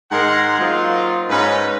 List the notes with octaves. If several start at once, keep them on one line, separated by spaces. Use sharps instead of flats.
G#2 D#3 G#3 A#4 F#5 C6
F#3 A#3 C4 D#4 F4
G#2 C#4 B4